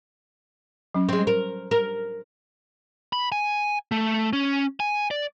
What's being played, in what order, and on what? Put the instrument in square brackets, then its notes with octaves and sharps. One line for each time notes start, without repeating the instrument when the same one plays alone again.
[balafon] F#3 C#4
[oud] G#3 C4
A#4
A#4
[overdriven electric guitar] B5
G#5
A3
C#4
G#5
D5